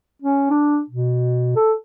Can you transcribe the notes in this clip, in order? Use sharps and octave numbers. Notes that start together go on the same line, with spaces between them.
C#4
D4
B2
A4